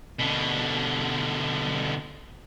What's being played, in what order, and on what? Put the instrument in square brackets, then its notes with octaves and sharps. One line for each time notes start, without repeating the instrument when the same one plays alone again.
[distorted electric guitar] B2 D3